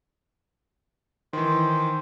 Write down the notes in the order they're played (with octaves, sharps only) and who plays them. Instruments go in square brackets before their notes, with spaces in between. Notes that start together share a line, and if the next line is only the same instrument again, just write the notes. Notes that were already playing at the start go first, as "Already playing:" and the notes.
[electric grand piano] D#3 E3 [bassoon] C5